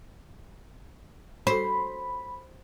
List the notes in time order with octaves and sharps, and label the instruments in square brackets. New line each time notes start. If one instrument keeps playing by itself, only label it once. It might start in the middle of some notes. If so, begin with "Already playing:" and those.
[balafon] F#4 A4 [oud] C5 [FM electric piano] B5